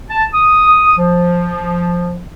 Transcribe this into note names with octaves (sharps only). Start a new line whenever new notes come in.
A5
D#6
F3